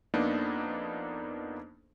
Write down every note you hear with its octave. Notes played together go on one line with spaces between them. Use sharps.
F2 A#3 B3 D4 D#4